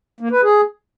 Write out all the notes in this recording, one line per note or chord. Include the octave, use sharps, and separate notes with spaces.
A#3
B4
G#4